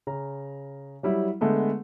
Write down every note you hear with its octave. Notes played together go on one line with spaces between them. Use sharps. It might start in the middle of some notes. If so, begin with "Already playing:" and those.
C#3 A#5
F#3 G3 E4
D3 G#3 A3 B3